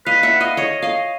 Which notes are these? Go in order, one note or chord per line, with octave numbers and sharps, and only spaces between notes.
B4 D#5 F5
E5 F#5
D#5 F5
C#5 D#5
D#5 F5